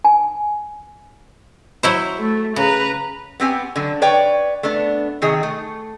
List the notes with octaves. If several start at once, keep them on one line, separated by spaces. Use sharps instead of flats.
G#5
F#3 E4 C5
A3
C#3 B4 A#5
B3 C4 G4 G#5
D3 F#3
B4 C#5 D5 G5
A3 B3 D4
C3 D#3 G#4
A3